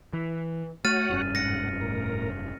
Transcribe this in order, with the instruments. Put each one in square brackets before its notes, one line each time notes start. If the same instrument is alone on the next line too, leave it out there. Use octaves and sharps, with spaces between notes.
[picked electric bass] E3
[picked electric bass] A3 [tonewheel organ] F#4 C#5 F#5 [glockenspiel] F6 A6 D#7
[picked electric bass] F1 G2 C#4
[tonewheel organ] G#2 F#5 [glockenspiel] A#6 C#7
[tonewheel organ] A2 A#4